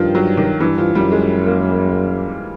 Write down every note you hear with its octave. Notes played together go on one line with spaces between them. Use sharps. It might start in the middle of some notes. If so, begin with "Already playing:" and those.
Already playing: G2 D#3 F3
F#3
D#3
G2 E3
F3
F#2 G3
G#3
A#3